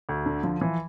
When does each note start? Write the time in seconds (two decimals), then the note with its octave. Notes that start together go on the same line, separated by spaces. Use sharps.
0.09 D2
0.26 D3
0.43 F3
0.61 E3